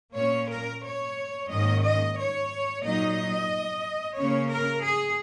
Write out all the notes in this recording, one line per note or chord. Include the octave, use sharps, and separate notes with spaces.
A#2 A#3 C#4 C#5
A#4
C#5
G#2 D#3 A#3 C#4 D#5
D#5
C#5
A#2 F#3 D#4 D#5
C#3 A#3 C#4 C#5
A#4
G#4